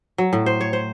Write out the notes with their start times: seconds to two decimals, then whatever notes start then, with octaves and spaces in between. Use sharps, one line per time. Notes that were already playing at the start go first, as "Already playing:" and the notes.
0.18 F#3
0.33 A2
0.46 C5
0.61 C#5
0.73 C5